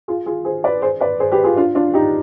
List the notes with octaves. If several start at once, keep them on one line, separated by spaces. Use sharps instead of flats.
F4 G#4
F4 G#4
G#4 C5
B4 D5
G#4 C5
B4 D5
G#4 C5
G4 B4
F4 G#4
D4 F4
D4 F4
D#4 G4